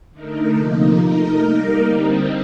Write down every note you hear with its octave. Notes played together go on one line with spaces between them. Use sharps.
D3 A3 D#4 A#4
C3 F3 A#3 D#4
A3 D#4 A#4 D#5
G3 A#3 D#4 A#4
D3 G3 C4 D#4